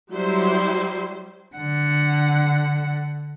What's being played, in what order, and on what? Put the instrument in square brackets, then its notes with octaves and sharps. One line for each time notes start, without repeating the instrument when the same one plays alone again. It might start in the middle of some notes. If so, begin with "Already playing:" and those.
[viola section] F#3 G3 E4 C5
[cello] D3 F#5